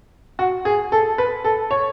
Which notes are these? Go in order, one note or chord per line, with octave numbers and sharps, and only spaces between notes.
F#4
G#4
A4
B4
A4
C#5